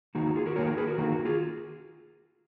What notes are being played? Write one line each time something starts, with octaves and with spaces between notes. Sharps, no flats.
D#3 A#3 D#4 F#4
F#4
F4 G#4
F#4 A#4
D#3 A#3 D#4 A#4 C#5
F#4 A#4
G#4 B4
F#4 A#4
D#3 A#3 D#4 F#4
F#4
F4 G#4